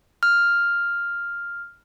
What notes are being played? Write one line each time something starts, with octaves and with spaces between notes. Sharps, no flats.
F6